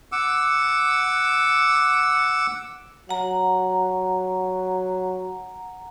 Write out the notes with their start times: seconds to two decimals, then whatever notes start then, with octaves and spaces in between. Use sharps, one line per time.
0.12 F#5 D6 E6
3.09 F#3 F#5 A#5